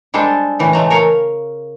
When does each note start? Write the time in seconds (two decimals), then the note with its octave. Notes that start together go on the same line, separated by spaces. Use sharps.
0.14 G3 G#3 D4 A4 C5
0.59 A2 C#3 E3
0.73 G#3 A3 A#5
0.90 A#4 C#5 F5